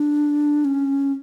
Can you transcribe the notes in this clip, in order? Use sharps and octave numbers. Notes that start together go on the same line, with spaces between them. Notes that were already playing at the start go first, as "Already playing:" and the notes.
Already playing: D4
C#4